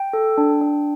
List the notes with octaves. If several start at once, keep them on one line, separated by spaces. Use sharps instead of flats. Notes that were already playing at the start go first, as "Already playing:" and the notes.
Already playing: G5
A4
D4
D4